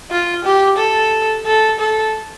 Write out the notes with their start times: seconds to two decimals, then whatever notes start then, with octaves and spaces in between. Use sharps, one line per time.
0.11 F4
0.45 G4
0.78 A4
1.46 A4
1.80 A4